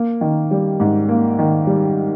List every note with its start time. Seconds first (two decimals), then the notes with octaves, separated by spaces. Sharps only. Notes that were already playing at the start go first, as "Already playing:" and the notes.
Already playing: A#3
0.21 D#3
0.51 G3
0.80 G#2
1.09 A#3
1.39 D#3
1.67 G3